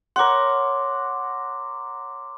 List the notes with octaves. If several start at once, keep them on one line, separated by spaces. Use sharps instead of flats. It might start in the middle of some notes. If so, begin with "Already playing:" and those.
A#4 C#5 F#5 C6 D6